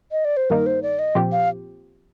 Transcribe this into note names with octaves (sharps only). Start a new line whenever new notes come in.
D#5
D5
C5
G2 D#3 A#3 D#4 A#4
C5
D5
D#5
A#2 F3 C4 G4
F5